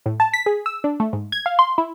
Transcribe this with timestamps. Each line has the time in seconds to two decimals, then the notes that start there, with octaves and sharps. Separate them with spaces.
0.06 A2
0.20 A5
0.34 B6
0.46 G#4
0.66 E6
0.84 D4
1.00 A3
1.13 G#2
1.32 G#6
1.46 F5
1.59 C6
1.78 E4